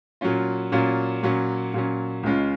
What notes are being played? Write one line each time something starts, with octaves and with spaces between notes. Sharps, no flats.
A#2 F#3 C#4 F4
A#2 F#3 C#4 F4
A#2 F#3 C#4
A#2 F#3 C#4
C#2 C#3 G#3 C#4 F4